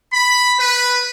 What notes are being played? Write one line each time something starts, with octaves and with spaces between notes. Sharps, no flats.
B5
B4